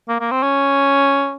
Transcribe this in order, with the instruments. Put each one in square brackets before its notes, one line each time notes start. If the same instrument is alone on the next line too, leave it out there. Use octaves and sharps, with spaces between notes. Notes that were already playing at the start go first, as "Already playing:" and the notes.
[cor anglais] A#3
A#3
C4
C#4